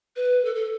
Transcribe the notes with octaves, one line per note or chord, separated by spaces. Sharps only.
B4
A4
A4